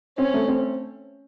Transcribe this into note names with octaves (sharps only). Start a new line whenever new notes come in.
C4 C#4
A3
C4